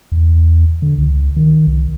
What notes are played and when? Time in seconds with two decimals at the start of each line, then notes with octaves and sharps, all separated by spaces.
0.12 E2
0.82 D3
0.98 C#2
1.36 D#3
1.67 C2